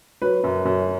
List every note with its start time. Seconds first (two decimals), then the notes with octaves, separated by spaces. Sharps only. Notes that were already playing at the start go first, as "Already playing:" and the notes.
0.22 F#3 B4
0.44 F#2
0.65 F#2